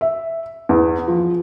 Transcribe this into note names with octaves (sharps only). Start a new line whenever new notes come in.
E5
E2
F3